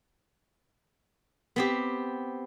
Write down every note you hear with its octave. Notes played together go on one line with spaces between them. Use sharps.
B3 C4 G4